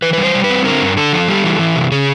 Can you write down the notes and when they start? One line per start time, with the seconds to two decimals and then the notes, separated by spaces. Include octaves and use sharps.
0.02 E3 B4
0.13 G3 B4
0.23 C5
0.35 G3
0.44 B4
0.50 C4
0.65 D3 A#4
0.80 G2
0.97 D3 A4
1.13 F3
1.28 G3
1.44 E3
1.59 E3
1.76 C3
1.91 C#3 G#4